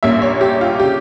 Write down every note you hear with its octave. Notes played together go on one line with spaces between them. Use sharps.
A#1 A#2 G3 A#3 C#4 E5
C#5
G4
F4
C#3 G4